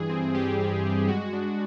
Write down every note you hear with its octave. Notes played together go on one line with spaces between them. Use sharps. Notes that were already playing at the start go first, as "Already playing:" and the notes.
Already playing: G2 E3 G#4
C4
G3 G4
C4
G3
G#3 F#4
D4